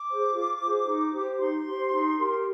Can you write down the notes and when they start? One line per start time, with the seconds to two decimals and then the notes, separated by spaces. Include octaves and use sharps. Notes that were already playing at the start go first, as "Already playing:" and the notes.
Already playing: D6
0.09 G#4 C5
0.34 F4
0.61 G#4 C5
0.87 D#4
1.13 G4 C5
1.39 D#4 C6
1.66 G4 C5
1.92 D#4
2.18 G4 A#4